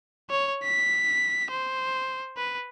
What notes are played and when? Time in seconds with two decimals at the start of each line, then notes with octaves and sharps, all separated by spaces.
0.30 C#5
0.63 B6
1.51 C5
2.37 B4